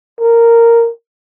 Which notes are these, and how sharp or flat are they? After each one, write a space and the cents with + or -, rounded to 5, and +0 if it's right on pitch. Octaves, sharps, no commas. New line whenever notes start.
A#4 -5